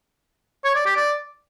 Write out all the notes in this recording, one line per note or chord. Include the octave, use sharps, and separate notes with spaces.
C#5
D5
G4
D5